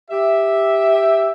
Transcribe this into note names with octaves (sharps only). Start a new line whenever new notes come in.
G4 E5